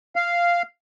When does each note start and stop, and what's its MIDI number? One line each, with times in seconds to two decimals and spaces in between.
0.16 0.62 77